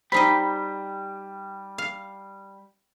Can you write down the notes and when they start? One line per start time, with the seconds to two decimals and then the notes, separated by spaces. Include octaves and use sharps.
0.12 G3 C4 D#4 G4 D#5 B5
1.78 F5